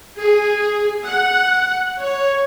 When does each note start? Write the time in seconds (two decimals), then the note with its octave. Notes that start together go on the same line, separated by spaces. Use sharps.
0.17 G#4
1.06 F#5
2.00 C#5